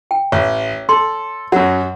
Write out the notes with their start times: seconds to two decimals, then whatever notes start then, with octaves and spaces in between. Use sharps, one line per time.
0.11 G5
0.32 A1 C#5
0.89 A4 C6
1.52 F#2 F#3 F#5